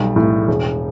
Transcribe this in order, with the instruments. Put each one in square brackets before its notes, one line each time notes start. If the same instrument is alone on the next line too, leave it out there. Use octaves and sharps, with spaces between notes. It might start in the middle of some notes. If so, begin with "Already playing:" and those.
Already playing: [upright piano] B1 G3
A2
E1